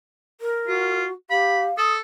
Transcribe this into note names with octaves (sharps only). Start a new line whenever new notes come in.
A#4
F4 F#4
G4 F5 B5
A4 D#6